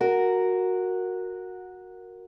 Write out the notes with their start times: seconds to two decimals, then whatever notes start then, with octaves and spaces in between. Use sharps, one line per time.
0.01 F#4 A#4